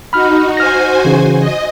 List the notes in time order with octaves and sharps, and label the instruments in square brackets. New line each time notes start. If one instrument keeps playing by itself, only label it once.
[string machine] D#4 F#4 [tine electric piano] B5 F6
[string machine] F#4 C5 G#5 [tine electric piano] F6 A#6
[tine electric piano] C#3 E3
[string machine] D#5